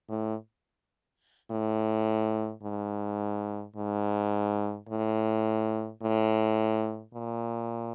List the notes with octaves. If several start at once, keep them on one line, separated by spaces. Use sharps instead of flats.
A2
A2
G#2
G#2
A2
A2
A#2